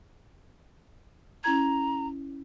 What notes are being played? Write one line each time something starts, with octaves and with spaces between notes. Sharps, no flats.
C#4 E4 A#5 G#6